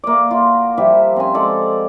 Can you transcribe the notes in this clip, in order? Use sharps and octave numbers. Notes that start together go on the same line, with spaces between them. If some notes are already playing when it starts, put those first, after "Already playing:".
A#3 D5
F4 F#4
F3 G3 G4 E5
C4 C#4 G#5
G#3 A4 D5